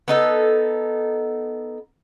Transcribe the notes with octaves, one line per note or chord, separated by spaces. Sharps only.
B3 D#4 A4